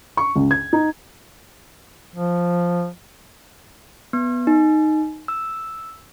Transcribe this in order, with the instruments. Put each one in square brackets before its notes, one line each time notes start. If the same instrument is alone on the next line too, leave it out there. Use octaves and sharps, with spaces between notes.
[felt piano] C#6
C#2
G#6
D#4
[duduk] F3
[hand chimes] B3
D#4
E6